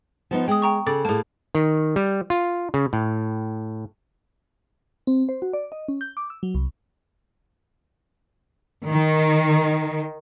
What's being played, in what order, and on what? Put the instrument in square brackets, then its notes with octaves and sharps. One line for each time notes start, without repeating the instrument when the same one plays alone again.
[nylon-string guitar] F3 B3 D#4
[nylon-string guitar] G#3 [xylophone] G5 D#6
[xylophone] G5 A#5 C#6
[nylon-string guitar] C#3 [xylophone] A4 D6 A6
[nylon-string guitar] A2 A#3 [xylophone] G#4 A5
[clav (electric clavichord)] D#3
G3
F4
C#3
A2
[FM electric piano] C4
C5
F#4
D5
D#5
C#4
G6
D6
E6
F#3
C2
[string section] D#3